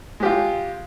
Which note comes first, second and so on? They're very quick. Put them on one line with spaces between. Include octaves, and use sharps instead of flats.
G#3 G4 F4